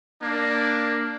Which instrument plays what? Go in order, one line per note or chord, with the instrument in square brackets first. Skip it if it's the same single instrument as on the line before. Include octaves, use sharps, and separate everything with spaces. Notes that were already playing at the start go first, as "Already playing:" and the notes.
[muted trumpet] A#3 [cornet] D4